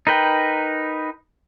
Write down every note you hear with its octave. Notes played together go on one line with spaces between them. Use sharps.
D#4 A#4 B4 G5